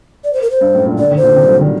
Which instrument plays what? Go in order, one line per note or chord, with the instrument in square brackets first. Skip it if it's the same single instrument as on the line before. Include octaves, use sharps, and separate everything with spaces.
[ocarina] D5
C5
A#4
C5
[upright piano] G2
F#2 A2
G2 A#2
[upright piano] D3 [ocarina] D5
[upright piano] D#3
[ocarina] C5
[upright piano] A#2 D3
C3 D#3
G3
D3 F#3
D#3 G3